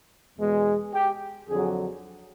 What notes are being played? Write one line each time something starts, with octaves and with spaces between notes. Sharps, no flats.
E2 B2 G#3
G4
F2 D3 F#3 G#4